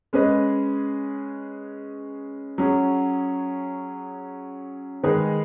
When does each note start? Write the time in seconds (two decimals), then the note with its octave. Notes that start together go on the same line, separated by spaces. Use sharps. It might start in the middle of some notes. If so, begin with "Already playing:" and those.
0.13 G#3 C#4 G#4 B4 D#5
2.58 F#3 C#4 G#4
5.03 D#3 G#3 D#4 G#4 B4